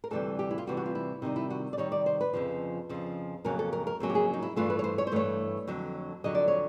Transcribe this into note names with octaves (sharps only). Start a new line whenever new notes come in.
A#4
D2 C3 E3 G3 A4
G4
E4
F4
D2 C3 E3 G3 F#4
F#4
F4
E4
C3 D#3 G3 D#4
E4
F#4
D5
C3 D#3 G3 C#5
D5
C5
B4
F2 C#3 F3
F2 C#3 F3
F2 C#3 F#3 A#3 C#4 A#4
A4
A#4
A#4
F2 C#3 F#3 A#3 C#4
G4
G#4
D#4
E4
G2 E3 A3 F4
B4
C#5
C5
C#5
C5
G2 E3 A3 C#5
F2 D3 F#3
F2 D3 F#3 D#5
D5
C#5